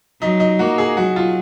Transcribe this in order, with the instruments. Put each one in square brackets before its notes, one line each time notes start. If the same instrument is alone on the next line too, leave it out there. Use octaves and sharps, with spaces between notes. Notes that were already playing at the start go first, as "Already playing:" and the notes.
[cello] F#3 [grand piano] D#4
[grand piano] D#4
[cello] A#3 [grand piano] F#4
[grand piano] G#4
[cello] F#3 [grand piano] F#4
[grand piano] F4